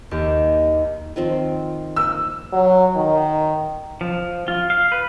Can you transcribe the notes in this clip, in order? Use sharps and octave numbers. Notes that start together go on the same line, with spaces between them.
D#2 G4
D#3 F3 C4
A#3 E6
F#3
D#3
F3
F4
F5
B4